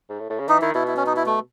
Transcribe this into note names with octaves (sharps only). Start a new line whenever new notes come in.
G#2
A2
A2
C#3
E3 D#4
D#3 E4
B2 E4
E4
C#4
D#4
E4
A3